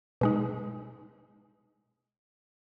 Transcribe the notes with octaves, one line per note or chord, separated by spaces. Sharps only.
B2 G#3 D#4